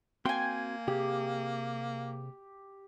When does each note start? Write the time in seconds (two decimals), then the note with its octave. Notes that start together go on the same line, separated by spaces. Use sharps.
0.26 A#3 C4 F#4 G5 G#5 C6
0.88 C3 G4 G#4